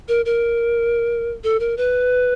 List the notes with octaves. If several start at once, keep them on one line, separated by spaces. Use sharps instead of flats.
A#4
A#4
A4
A#4
B4